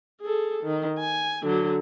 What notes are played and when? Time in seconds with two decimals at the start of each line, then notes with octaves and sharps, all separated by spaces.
0.21 G#4 A4
0.63 D#3
0.99 G#5
1.42 D3 F#3